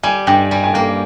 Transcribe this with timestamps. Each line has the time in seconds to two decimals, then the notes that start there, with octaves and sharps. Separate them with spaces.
0.03 G3 G#5
0.27 G2 G5
0.51 G3 G#5
0.64 G#5
0.74 A#3 G5